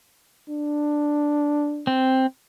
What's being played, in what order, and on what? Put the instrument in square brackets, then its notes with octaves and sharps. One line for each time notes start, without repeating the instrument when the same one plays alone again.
[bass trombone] D4
[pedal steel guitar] C4